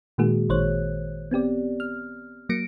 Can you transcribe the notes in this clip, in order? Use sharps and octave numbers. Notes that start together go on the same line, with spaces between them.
A#2 D#3 G#3 A#3 F#4 G#4
A1 D#3 C5 C#5 F#6
B3 C4 G4 D5
F6
F#3 A#3 A#6 C#7 D7